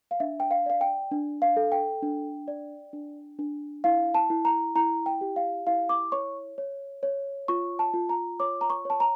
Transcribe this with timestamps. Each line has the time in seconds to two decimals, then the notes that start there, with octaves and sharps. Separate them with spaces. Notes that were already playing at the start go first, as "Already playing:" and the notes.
0.11 F5
0.20 D4 E5
0.40 G5
0.51 F5
0.66 D5 F5
0.81 G5
1.11 D4
1.42 F5
1.57 A4
1.72 G5
2.03 D4
2.48 D5
2.93 D4
3.39 D4
3.84 E4 F5
4.14 A5
4.30 E4
4.45 A#5
4.75 E4 A#5
5.06 G5
5.21 G4
5.36 F5
5.67 E4 F5
5.89 D6
6.12 C#5 C#6
6.58 C#5
7.03 C#5
7.48 F4 C#6
7.79 A5
7.94 F4
8.09 A#5
8.40 C#5 D6
8.61 A#5
8.70 C#6
8.85 C#5 A5
9.00 A#5